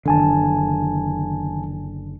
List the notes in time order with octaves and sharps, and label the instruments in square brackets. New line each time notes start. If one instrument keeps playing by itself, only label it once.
[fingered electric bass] F#1 D3 [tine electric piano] D#3 G#5 A5